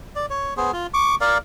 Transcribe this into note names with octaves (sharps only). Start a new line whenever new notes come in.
D5
C#5
B3 G#4 C5
F4
C#6 D6
A#4 D5 F5